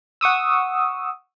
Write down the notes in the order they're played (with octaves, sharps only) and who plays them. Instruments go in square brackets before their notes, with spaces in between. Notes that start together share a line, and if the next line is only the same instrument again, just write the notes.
[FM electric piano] F#5 C#6 D#6 E6